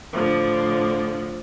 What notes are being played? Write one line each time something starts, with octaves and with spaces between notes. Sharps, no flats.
A2 D3 F3